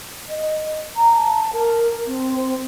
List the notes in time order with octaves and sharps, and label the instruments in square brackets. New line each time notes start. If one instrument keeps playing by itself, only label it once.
[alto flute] D#5
A#5
A5
A#4
C4